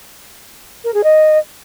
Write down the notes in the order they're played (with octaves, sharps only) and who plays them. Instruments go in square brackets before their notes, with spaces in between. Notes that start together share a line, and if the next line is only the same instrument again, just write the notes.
[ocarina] A#4
G#4
D#5